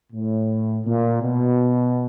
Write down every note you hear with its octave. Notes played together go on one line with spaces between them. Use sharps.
A2
A#2
B2